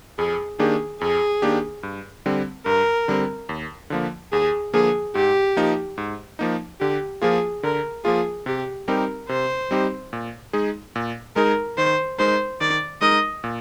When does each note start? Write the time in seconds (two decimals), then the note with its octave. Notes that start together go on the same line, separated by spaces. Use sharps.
0.18 F2 G#4
0.59 D#3 A#3 D4 G4 G#4
1.01 F2 G#4
1.42 D#3 A#3 D4 G4
1.83 G2
2.26 D3 G3 C4
2.66 G2 A#4
3.08 D3 G3 C4
3.49 D#2
3.90 D3 F3 A#3
4.32 D#2 G#4
4.74 D3 F3 A#3 G#4
5.15 G#2 G4
5.57 F3 A#3 D#4
5.98 G#2
6.39 F3 A#3 D#4
6.80 D3 G4
7.22 F3 A#3 F4 G#4
7.63 D3 A#4
8.04 F3 A#3 F4 G#4
8.46 C3 G4
8.88 G3 C4 D#4 G4 A#4
9.29 C3 C5
9.71 G3 C4 D#4 G4
10.13 A#2
10.53 G#3 D#4 G#4
10.96 A#2
11.36 G#3 D#4 G#4 A#4
11.78 D#3 C5
12.19 G#3 D#4 A#4 C5
12.61 D#3 D5
13.01 G#3 D#4 A#4 D#5
13.44 A#2